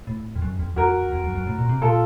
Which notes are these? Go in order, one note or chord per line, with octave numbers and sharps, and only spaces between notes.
A2
F2
F#2
F2
F2 F#4 A#4
F2
F#2
F#2
A2
A#2
C3
A#2 F4 A4